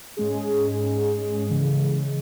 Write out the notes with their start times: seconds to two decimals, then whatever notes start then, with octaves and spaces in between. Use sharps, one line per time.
0.17 G#2 G#3 C#4 G#4
1.48 C#3 E3 G#3